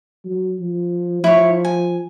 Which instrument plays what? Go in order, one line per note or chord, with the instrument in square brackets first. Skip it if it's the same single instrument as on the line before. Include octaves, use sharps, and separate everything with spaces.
[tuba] F#3
F3
[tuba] F3 [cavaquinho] E4 C#5
[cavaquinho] G#5